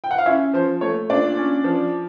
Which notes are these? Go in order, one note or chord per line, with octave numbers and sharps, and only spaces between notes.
G5
F#5
F5
C#4 E4 E5
F3 C5
A3 C#5
A#2 D4 D5
C#4
F3